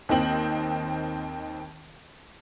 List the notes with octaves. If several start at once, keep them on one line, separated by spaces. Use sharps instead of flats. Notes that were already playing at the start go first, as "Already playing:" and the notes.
D#2 D#3 C4 F#7